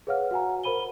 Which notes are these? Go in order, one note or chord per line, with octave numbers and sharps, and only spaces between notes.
G#4 B4 C#5 F5 F#5 F6
F#4 F#5 G#5 A#5
A#4 C5 B5 D#7 G7